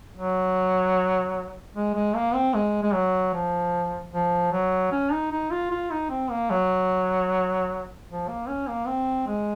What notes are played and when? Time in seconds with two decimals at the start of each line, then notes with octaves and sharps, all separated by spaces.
0.17 F#3
1.75 G#3
1.95 G#3
2.15 A#3
2.34 C4
2.54 G#3
2.83 G#3
2.94 F#3
3.34 F3
4.13 F3
4.52 F#3
4.92 C#4
5.12 D#4
5.31 D#4
5.51 F4
5.71 F4
5.91 D#4
6.10 C4
6.30 A#3
6.50 F#3
8.09 F3
8.28 A#3
8.48 C#4
8.68 A#3
8.87 C4
9.27 G#3